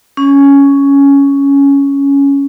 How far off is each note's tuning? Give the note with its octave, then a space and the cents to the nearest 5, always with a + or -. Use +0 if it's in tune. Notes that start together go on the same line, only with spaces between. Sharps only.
C#4 +10